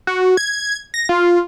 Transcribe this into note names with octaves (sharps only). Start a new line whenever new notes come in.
F#4
G#6
A#6
F4